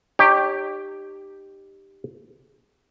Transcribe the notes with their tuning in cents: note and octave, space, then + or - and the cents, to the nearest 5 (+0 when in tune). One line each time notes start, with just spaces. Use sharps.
D#4 -35 G4 +0 C#5 +0